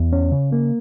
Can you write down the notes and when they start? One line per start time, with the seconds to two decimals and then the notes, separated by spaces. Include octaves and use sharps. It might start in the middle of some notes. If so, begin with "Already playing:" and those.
Already playing: E2
0.13 C#4
0.32 C#3
0.52 A#3